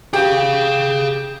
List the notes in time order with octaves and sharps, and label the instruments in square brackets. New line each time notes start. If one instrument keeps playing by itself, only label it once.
[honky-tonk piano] G4 [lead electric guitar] G#4 F5